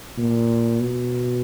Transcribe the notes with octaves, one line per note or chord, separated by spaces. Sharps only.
A#2
B2